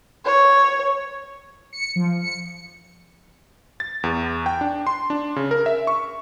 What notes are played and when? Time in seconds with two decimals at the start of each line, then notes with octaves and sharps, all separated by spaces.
0.25 C#5
1.73 C#7
1.96 F3
2.21 C#7
3.80 A6
4.04 E2
4.46 G5
4.61 D4
4.87 C6
5.10 D4
5.36 C#3
5.51 A#4
5.66 E5
5.87 C#6